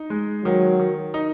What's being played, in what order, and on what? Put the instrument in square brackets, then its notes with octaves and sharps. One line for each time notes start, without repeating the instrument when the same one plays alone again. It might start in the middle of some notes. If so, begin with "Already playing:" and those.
Already playing: [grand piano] D#4
G#3
[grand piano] D#3 [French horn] F#3
[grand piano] D#3
D#4